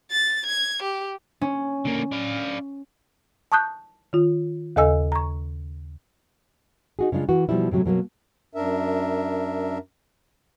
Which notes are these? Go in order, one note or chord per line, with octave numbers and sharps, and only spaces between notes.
A6
G#6
G4
C#4
D3 A#3
D4 F5
A5 C#6 D#6 F#6 G6
D#3 F4
D#2 C#3 A4 D#5 G#5 E6
A#5 C#6
D#4 F#4 G#4
C#3 G#3 D4 F4
E3 F#4
B2 F3 G3 E4
A2 C3 F#3 A3
B2 F#3 A3 A#3
F#2 D4 A#4 E5